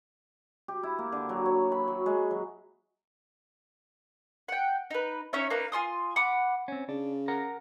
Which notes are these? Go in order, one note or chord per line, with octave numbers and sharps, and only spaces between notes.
G4
E4
A#3
D3
F#3
C#5
B5
F#3
G#3
F#3
F#5 G5
D#4 B4
C#4 D#4 C#5 E5
A#3 D#4 B4 A#5
F4 G#5 C6 D#6
F#5 B5 D6
C4 C#4
C#3 D4
A#4 F#5 A#5